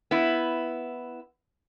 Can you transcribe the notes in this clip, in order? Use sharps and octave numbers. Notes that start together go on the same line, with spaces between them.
B3 E4